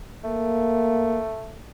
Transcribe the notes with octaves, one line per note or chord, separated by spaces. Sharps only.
A3 A#3